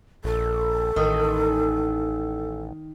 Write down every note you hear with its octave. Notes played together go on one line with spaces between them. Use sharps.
A#1 A4
A1 D#3